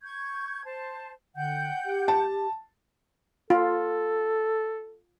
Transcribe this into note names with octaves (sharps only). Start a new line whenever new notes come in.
C#6 G6 G#6
C5 A5
D3 F#5 G5 G6
G4
A5
F4 A4